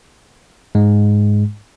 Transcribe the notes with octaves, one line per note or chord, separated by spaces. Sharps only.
G#2 G#3